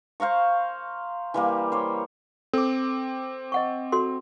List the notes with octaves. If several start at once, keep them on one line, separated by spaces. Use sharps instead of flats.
C5 F5 A#5 C#6
E3 G3 A#3
C5 C#5
C4 A4 D6
D#5 F#5 C#6
F#4 A4 C6